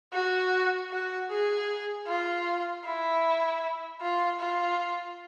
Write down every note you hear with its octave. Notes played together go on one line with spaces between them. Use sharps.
F#4
F#4
G#4
F4
E4
F4
F4